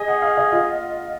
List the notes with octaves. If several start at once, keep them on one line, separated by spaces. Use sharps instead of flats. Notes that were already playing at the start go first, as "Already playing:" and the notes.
Already playing: G#4 D#5
F#5
F5
D#5
F4